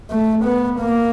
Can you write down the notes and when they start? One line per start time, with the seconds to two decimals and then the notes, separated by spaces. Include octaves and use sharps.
0.11 A3
0.45 B3
0.80 A#3